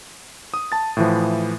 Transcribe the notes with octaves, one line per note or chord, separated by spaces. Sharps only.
D#6
A5 A6
A2 E3 F3